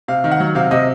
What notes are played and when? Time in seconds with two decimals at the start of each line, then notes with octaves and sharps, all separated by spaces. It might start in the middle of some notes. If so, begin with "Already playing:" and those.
0.08 C3 F5
0.24 D#3
0.32 F#5
0.40 F#3
0.55 C3 F5
0.71 C3 D#5